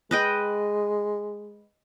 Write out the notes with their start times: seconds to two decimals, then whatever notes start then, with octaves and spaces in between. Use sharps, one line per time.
0.11 G#3 B4 D#5 G5